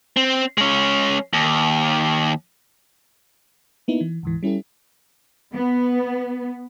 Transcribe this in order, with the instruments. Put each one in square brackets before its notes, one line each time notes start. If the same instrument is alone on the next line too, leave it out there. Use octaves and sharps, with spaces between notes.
[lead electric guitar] C4
G#3 C#4
D#2
[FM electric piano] A#3 B3 D#4 E4
E3
D2 G#2 E3
G3 C#4 E4 G4 A4
[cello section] B3